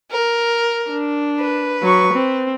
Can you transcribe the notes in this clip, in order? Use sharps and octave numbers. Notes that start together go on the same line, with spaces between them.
A#4
D4
B4
F#3 C#6
C4